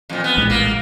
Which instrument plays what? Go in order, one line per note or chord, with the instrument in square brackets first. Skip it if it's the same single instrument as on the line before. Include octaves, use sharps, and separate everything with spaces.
[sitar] F2 A#2
B3
[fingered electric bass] A#1 A2 G#3
[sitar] A#3